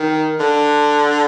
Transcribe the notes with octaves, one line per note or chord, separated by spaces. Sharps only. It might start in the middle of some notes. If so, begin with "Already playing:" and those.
Already playing: D#3
D3